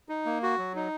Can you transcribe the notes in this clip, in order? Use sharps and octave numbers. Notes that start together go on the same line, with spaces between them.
D#4
A#3
F#4
F#3
D#4